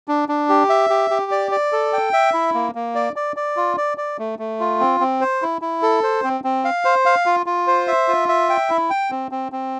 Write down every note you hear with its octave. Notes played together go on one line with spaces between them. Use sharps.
D4
D4
G4
E5
G4
G4
D5
D5
A4
G5
E5
E4
A#3
A#3
D5
D5
D5
F4
D5
D5
A3
A3
F4
C4
C4
C5
E4
E4
A4
C5
C4
C4
F5
C5
F5
F4
F4
C5
E5
F4
E5
G5
E4
G5
C4
C4
C4